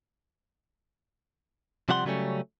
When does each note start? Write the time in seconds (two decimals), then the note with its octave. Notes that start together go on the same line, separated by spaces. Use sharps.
1.89 C3 F3 G3 F#5 B5 C6
2.05 C#3 F#3 G3 A3 C#4